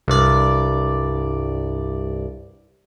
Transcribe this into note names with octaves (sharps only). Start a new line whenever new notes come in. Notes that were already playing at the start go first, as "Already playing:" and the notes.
C2 G2 D5